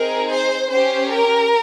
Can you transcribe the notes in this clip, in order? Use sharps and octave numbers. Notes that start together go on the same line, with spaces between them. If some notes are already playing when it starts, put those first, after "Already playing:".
Already playing: C4 D#4 G#4 A#4
C5
C#4 G4 C5
A#4